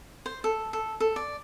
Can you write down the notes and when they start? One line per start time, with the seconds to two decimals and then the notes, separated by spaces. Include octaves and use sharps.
0.26 C5
0.44 A4
0.73 A4
1.00 A4
1.16 D5